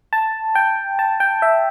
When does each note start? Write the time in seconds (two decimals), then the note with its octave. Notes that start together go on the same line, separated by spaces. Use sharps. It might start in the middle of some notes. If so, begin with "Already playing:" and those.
0.13 A5
0.55 G5
0.99 A5
1.20 G5
1.42 E5